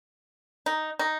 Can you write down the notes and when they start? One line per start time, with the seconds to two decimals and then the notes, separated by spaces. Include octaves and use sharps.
0.66 D#4
0.99 D#4